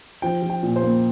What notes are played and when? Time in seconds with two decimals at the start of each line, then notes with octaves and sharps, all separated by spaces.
0.22 F3 G5
0.42 F3
0.50 G5
0.63 A#2
0.76 C5
0.83 A#3